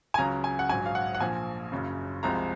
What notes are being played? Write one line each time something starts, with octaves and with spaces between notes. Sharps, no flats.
G#5
C#2 C#3 F#3 A#5
G#5
F#5
A#1 G#2 F#3 G#5
F5
F#5
F#5
A#1 A#2 F3 G#5
F#1 F#2 C#3
C2 C3 F3 G#3 A#5